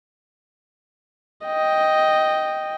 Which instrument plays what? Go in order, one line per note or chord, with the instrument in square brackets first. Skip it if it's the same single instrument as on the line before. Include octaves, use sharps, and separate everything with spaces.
[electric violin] D#5 G5